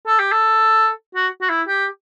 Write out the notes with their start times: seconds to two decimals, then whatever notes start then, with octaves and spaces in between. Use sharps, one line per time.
0.07 A4
0.19 G4
0.32 A4
1.15 F#4
1.41 F#4
1.49 E4
1.67 G4